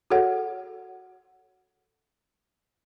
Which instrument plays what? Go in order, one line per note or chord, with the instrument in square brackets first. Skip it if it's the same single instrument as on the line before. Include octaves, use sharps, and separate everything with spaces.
[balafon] F#4 G#4 A4 C#5 F#5